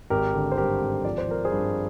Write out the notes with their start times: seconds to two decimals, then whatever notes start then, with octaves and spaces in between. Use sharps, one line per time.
0.10 G#1 G4 A#4
0.34 D3
0.52 C5
0.57 G2 G4 A#4
0.81 G#1
1.04 F3 D5
1.18 C5
1.28 F3 A#4
1.45 G#4 C5
1.52 G2